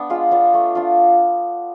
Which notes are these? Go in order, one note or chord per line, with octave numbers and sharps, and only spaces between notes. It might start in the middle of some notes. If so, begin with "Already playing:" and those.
Already playing: B3 D4
G#3 F4
B3 D4 F4
A3
D4 F4